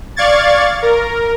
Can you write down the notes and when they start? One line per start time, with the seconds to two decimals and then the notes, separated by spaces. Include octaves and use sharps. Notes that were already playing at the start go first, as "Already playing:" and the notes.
0.16 D5 F5 C#6 G#6 A6
0.82 A#4